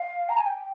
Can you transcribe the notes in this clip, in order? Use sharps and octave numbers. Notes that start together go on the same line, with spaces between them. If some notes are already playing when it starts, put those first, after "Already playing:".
Already playing: F5
A#5
G#5
G5